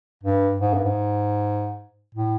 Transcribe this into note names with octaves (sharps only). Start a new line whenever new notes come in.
G2
G#2
G2
G#2
A2